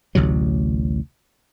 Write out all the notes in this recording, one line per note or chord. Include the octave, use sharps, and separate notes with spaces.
A1 D2 C3 F#3